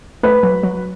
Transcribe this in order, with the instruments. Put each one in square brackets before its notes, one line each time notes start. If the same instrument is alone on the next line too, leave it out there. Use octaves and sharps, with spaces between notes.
[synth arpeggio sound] A3 [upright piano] B4
[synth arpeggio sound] F#3
F#3